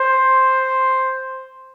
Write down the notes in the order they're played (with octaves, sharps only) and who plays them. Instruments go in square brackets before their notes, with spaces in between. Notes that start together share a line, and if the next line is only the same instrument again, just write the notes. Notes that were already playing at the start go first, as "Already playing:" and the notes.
Already playing: [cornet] C5